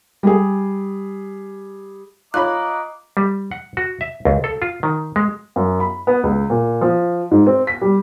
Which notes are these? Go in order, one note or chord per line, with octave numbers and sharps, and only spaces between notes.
G3 G#4
F4 C#5 D#5 A#5 B5 D6 F#6
G3
F#5
F#4
E5
C#2
A4
F4
D#3
G#3
F#2
B5
B3
C#2
A#2
F3
G#2
C4
B6
G3